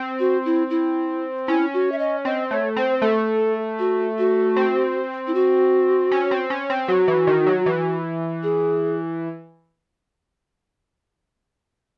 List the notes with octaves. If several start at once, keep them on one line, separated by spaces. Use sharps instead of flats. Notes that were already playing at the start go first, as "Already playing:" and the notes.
Already playing: C4
F#4
E4
E4
C#4 E4
F#4
E5
D#5
C4 D#5
A3 C#5
C4 C5
A3 A4
F#4
F#4
C4
E4
F#4
C#4
C4
C#4
C4
F#3 F#4
E3
D#3
F#3
E3
G#4